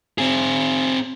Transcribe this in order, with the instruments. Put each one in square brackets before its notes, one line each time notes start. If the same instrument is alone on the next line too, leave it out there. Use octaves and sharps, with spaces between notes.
[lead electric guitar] C4 G#4